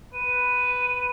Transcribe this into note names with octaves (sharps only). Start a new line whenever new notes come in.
B4 D#7